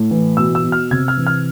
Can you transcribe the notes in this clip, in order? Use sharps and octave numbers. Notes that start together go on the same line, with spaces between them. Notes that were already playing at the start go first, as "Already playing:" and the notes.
Already playing: A2
E3
B2 E6
E6
B2
F6
C3 G#6
F6
E3
F6